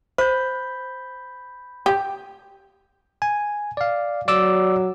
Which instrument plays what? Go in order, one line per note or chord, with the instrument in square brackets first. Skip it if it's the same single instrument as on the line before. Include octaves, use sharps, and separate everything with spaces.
[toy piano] C5 [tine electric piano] B5 G6
[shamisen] G4
[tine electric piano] G#5
D5 F5
[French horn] F#3 [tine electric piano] D5 D6 E6